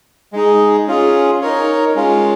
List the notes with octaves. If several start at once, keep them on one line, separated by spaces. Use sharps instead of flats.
G#3 D#4 G#4
C#4 F4 G#4
D#4 A#4 C#5
G#3 C#4 F4